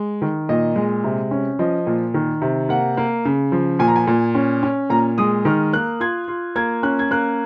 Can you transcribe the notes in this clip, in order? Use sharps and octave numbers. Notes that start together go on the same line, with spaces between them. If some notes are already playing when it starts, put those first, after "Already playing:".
Already playing: G#3
D#3
A#2 D#5
G#3
C3
C#4
F3 D#5
A#2
D#3
C3
A#3 F#5
A#3
C#3
F3
A#2 G#5
A#5
G#5
A#2
C#4
C#4
A#2 A#5
G#3 D#6
D#3 F6
A#3 F#6
F4 G#6
F4
A#3 G#6
C#4 F#6
G#6
A#3 F#6